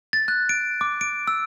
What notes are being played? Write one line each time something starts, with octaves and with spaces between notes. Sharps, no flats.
A6
F#6
D7
D6
D7
E6